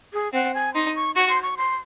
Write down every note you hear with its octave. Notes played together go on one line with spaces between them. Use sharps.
G#4
C4 F#5
G#5
D#4 C6
C#6
F#4 C#6
C6
C#6
C6